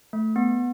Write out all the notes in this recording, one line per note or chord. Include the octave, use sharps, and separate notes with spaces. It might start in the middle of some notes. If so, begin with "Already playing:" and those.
A3
B3